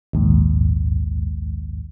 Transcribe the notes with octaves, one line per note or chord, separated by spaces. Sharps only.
A#1 D#2 G#2